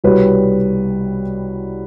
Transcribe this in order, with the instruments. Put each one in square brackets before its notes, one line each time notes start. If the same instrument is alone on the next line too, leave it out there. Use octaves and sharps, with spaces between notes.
[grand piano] C2 B2 G3 B4 C#5